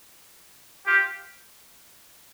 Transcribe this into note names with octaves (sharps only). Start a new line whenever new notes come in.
F4 G4